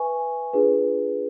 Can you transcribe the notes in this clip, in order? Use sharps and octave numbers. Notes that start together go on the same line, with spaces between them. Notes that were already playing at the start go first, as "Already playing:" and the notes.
Already playing: B4 E5 G#5 C#6
D4 F4 G#4 B4